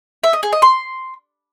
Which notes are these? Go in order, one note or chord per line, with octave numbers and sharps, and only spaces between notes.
E5
D#5
G#4
D#5
C6